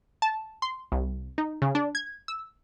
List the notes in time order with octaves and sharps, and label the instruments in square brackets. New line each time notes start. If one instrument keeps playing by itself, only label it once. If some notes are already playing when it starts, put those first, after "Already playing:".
[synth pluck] A5
C6
C2
D#4
C#3
D4
G#6
E6